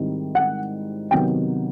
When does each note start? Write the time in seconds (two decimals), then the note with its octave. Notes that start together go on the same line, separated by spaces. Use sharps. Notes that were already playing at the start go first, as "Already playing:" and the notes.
Already playing: G#2 D#3 G3 C4 E4
0.35 F#5
1.11 C3 D#3 F#3 B3 G5